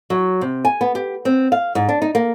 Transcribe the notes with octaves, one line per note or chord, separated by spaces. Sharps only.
F#3
C3
G#5
B3
G4
C4
F5
G#2
D4
D#4
A#3